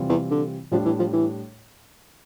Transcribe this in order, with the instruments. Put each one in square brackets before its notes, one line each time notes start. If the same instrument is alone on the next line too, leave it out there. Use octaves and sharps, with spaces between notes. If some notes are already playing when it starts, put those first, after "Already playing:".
Already playing: [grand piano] C3 E3 G3 C4 F4
[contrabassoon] E2
D3
[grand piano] A2 G3 D4 [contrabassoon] F3
[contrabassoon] E3
F3
E3